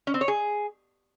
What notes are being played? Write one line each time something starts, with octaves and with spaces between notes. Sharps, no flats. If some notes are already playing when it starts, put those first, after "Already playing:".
C#4
C4
C#5
G#4